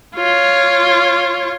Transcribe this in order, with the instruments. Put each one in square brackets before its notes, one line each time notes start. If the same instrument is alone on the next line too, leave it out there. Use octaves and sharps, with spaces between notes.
[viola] F4 C#5